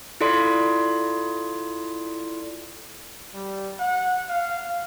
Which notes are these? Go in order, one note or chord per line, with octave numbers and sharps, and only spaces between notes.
E4 F4 A4 D5 C6
G3
F#5
F5